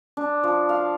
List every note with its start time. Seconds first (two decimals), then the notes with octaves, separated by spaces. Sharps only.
0.17 D4
0.44 F3
0.69 F5